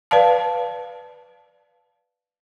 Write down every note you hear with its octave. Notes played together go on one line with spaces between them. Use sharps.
B4 D5 F5 A5